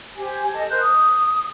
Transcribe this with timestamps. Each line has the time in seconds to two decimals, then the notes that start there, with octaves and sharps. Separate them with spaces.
0.17 G4 C5 G#5
0.52 A4 D#5 A5
0.70 A#4 C5 F#6 G6
0.81 D#6